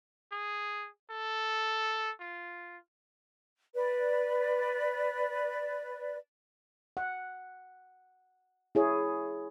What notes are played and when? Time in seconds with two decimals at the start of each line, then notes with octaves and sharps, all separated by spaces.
0.32 G#4
1.10 A4
2.21 F4
3.74 B4 D5
6.97 F#5
8.75 E4 G#4 C#5